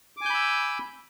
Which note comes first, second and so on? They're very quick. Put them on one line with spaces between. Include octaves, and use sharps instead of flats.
D6 G#5 G6 B5 E6